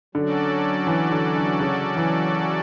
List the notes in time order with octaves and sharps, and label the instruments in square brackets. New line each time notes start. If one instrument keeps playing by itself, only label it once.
[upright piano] D3 [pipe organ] F#3 C#4 F#4 A4 D5
[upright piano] E3
D3
D3
C#3
E3